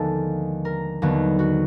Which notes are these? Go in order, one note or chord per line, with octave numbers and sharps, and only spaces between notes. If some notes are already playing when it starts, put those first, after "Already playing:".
Already playing: D#2 D3 F3 G#3 B3 A4
A#4
D#2 D3 F#3 B3
F#4